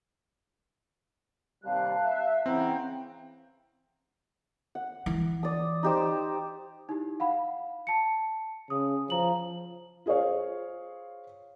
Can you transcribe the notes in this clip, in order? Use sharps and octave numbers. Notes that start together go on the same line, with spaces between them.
D#2 C3 G3 F5 A5 F#6
E5
C#3 E3 C4 F#5 G5 A#5
F#5
E3
D5 D#6
D#4 G4 C5
D#4 E4 G4
F5 F#5 B5
A5 C#7
C#3 D#6
F3 A#5 F#7
F4 G#4 C5 C#5 F5